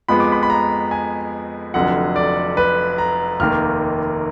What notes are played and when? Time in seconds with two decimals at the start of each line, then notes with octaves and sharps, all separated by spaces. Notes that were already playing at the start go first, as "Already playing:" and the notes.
0.09 F2 F3 G#3 B3 B5
0.20 D6
0.32 B5
0.43 B5
0.50 A#5
0.91 G#5
1.74 F1 F2 D3 F#3 F#5
2.16 D5
2.57 B4
2.98 A#5
3.40 F1 D#2 D#3 A#3 F6